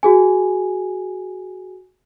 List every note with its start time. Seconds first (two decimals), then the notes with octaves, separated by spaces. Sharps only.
0.03 F#4 G#4 G#5